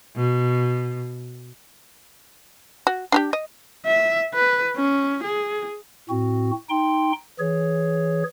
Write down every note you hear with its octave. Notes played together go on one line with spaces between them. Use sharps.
B2
F#4
D4 D#4 G4
D#5
E5
B4
C#4
G#4
A2 C4 F#4
D#4 G5 C6
E3 G#4 C#5